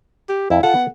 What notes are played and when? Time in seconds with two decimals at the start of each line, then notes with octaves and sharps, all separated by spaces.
0.29 G4
0.50 F2 E4
0.63 F4 A4 F#5
0.75 B3